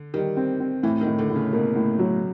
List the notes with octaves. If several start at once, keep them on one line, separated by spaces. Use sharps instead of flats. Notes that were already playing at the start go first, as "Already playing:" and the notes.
Already playing: D3
D#3 G3
C4
C4
A2 E3
D#3
A2
D3
A2
C#3
B2 A#3
A2
F#3